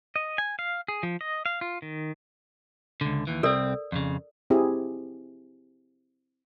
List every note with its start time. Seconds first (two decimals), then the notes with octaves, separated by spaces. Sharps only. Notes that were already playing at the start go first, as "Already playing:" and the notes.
0.16 D#5
0.38 G#5
0.59 F5
0.88 G#4
1.03 F3
1.21 D#5
1.46 F5
1.61 F4
1.82 D#3
3.01 C#2 D3
3.27 D#2 E3
3.43 C2 C4 A4 A#4 D5
3.92 F2 C#3
4.50 C4 E4 G4 G#4